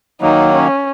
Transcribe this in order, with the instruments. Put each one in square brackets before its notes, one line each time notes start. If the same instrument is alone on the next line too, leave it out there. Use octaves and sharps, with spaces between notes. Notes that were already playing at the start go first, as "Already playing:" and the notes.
[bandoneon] D#3 F#3 A#3 [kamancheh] D#4
[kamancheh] C#4